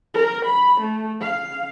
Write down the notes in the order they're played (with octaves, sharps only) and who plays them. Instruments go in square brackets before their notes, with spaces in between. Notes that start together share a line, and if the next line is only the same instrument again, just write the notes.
[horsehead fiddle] A#4
B5
A3
F5